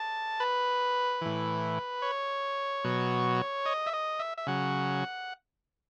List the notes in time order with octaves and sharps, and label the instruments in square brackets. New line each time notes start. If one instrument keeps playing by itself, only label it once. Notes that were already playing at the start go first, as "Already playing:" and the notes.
Already playing: [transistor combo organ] A5
B4
A2 E3
C#5
B2 F#3
D#5
E5
D#5
E5
E5
C#3 F#3 F#5